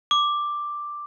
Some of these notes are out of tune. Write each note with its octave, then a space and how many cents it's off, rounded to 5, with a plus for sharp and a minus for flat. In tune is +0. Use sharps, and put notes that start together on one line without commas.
D6 +5